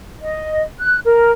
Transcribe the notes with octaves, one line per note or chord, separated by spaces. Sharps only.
D#5
F#6
A#4